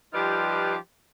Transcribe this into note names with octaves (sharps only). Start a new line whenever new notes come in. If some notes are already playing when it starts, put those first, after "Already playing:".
F3 G3 D#4 F4 G4 B4